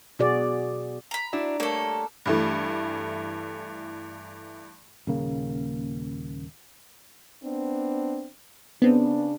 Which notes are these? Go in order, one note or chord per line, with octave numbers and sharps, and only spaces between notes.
B2 F#4 G#4 D5
A#5 B5
D4 E4 F#4
G3 A3 A#3 A4 C#5
G2 E3 A3
D#1 C#3 A#3
B3 C4 D4
C#3 B3 C4 D4